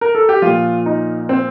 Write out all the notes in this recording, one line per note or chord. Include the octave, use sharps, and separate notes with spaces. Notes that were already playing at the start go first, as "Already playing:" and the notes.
A#4
A4
G4
A#2 F3 F4
D#4
C4